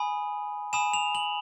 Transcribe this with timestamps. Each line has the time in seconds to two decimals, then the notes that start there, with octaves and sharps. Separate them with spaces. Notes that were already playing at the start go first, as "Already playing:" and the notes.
Already playing: G#5 B5 D#6
0.73 G#5 B5 D#6 E7
0.93 F7
1.15 F#7